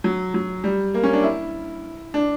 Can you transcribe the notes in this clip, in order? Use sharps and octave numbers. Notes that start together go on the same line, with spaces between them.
F#3
F#3
G3
A#3
C#4
D4
E4
D4